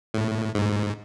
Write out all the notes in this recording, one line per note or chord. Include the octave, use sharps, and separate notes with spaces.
A2
G#2